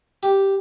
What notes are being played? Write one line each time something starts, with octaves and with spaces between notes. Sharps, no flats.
G4